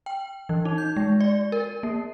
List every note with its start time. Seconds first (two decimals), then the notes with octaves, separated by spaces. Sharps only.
0.06 G5
0.49 E3
0.65 D#4
0.78 G6
0.96 G#3
1.20 D5
1.52 A#4
1.83 A#3